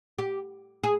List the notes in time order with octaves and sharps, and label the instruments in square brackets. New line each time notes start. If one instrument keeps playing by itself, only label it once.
[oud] G4
G#4